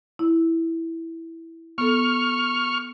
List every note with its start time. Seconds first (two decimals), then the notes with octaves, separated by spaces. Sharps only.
0.19 E4
1.78 B3 A4 C#6 F6